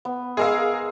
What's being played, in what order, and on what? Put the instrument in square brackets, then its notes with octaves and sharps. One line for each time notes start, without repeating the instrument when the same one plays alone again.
[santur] B3
[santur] G#3 E6 [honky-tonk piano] G#4 A#4 F5